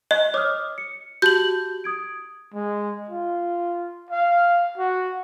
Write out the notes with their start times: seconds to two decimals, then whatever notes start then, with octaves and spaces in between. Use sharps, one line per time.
0.11 D#5 F#6
0.34 C#5 D6 D#6 F6
0.78 C#7
1.22 F#4 G4 A5 G6 F#7
1.84 D#6 G#6 D7
2.54 G#3
3.09 F4
4.10 F5
4.77 F#4